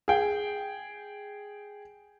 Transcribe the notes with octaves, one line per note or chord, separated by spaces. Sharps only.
G#4 G5